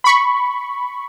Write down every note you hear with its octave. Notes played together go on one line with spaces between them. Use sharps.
B5 C#6